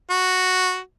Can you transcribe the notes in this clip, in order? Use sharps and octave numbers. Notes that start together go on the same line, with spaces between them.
F#4